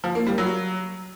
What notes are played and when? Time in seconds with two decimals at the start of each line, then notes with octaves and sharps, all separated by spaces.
0.04 F3
0.15 A#3
0.27 G3
0.38 F#3